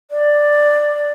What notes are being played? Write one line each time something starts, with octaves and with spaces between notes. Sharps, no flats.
D5